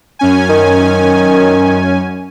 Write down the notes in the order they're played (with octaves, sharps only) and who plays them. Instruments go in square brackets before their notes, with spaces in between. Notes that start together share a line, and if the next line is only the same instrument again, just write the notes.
[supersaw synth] F#2 C#4 G#5
[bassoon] D#3